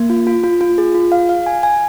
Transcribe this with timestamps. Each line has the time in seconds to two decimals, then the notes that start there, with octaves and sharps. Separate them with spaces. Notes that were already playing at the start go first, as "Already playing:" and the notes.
Already playing: A#3
0.10 F4
0.27 F4
0.44 F4
0.61 F4
0.78 G#4
0.95 F4
1.12 F5
1.29 F5
1.46 G#5
1.63 G#5